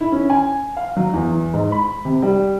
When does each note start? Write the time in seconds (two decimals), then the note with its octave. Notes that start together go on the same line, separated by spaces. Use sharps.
0.01 E4
0.12 C#4
0.30 G#5
0.77 F5
0.97 F#3
1.13 E2
1.54 G#2
1.72 B5
2.05 C3
2.22 G3